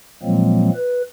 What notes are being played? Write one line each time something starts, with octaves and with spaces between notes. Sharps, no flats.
A#2 F3 F#3 G#3 A#3 C4
B4